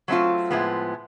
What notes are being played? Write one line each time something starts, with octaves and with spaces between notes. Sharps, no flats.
F#3 A3 C4 F4
A2 F3 G#3 B3